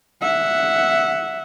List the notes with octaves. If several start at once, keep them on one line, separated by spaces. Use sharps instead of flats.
E5 F#5